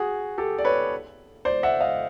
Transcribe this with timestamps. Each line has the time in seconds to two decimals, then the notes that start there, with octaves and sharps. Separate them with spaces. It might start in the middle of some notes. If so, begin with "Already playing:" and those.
Already playing: F#4 G#4
0.38 G4 A4
0.58 D5
0.65 B4 C#5
1.45 C5 D5
1.63 E5 F#5
1.81 D#5 F5